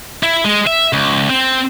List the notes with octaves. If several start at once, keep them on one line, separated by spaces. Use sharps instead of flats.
E4
G#3
E5
C#2
C4